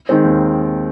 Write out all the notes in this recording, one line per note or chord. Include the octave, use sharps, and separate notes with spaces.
D#3 G#3 C4
D#2